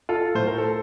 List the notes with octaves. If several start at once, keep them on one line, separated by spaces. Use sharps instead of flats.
F4 A4
A2 C5
A#4
A4